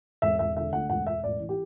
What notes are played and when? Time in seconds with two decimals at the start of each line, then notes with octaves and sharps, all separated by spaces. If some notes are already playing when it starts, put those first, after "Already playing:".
0.22 E1 E5
0.39 E1 E5
0.56 D3 E5
0.73 D2 F#5
0.89 E1 F#5
1.07 E1 E5
1.23 A1 D5
1.40 E3
1.49 G4